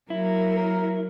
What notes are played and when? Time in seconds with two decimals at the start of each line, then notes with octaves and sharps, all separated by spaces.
0.10 F#3 A#3 E4
0.56 A#4